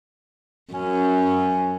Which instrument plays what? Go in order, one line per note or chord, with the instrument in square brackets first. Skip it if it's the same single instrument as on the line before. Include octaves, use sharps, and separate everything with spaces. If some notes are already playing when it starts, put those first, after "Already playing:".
[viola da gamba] F#2 [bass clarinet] C#4